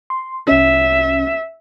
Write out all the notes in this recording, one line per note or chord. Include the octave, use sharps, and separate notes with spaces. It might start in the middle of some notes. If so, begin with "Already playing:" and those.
C6
C2 C#4 E5